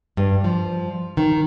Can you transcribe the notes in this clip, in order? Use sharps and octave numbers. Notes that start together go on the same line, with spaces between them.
G2
F3
D#3